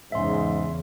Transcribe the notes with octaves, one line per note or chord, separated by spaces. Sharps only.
E2 G#2 C#3 E5 C6